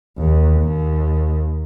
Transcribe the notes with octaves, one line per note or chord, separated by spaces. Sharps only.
D#2
D#2